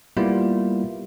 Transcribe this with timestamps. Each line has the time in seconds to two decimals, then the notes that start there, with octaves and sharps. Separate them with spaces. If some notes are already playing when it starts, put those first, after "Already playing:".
0.17 G3 A#3 B3 E4 F4